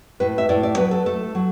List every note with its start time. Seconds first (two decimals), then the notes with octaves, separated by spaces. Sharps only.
0.20 A2 B4
0.38 E5
0.49 A2 D5
0.63 D5
0.77 F#3 B4
0.91 A4
1.06 A3 A4
1.35 F#3